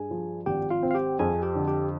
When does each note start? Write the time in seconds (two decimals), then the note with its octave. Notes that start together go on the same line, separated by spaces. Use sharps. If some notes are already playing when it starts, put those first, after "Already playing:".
Already playing: G2 G#4 G#5
0.11 F3
0.46 G#1 G4 G5
0.70 F4 F5
0.83 C4
0.91 F5
0.95 G4 G5
1.19 F2 G#4 G#5
1.43 G4 G5
1.55 D3
1.67 G4 G5